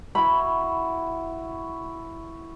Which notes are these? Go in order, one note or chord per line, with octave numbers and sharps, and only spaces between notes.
E4 F#4 B5